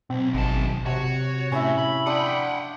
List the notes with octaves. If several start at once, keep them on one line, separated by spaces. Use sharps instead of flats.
B1 C4
G#1 F#2 A5
C3 F#4 C#5
A2 C#4 E4 E5
B5
D4 F#5 G5 C6 D#6